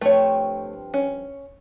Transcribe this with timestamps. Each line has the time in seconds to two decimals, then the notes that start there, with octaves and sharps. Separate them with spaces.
0.01 G2 F3 A3 C4 C#5
0.94 C#4